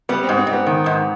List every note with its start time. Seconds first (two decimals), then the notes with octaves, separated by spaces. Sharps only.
0.09 G3 B3
0.23 C4
0.29 G#2
0.37 C4
0.47 G#2
0.53 B3
0.67 D#3
0.86 G#2